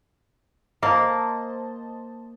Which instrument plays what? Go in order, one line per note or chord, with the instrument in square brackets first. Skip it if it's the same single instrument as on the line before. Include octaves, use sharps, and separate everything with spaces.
[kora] A#3 A#4 [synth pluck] C5 D#5 A5